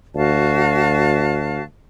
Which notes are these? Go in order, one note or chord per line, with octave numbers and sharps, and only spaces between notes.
D2 F#4 F5 A5